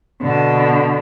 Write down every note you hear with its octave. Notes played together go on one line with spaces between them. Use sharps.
B2 D3